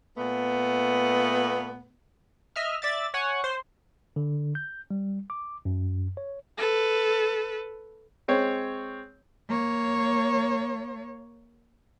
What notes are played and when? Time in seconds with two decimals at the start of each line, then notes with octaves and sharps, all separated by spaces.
0.17 A#2 A3 B3
2.56 D#5 E5 F6
2.82 D5 E5 A6
3.14 C#5 F#5 G#5
3.44 C5
4.16 D3
4.55 G6
4.91 G3
5.30 D6
5.65 F#2
6.17 C#5
6.58 A4 B4
8.28 G#3 C4 C#5
9.48 A#3 C#5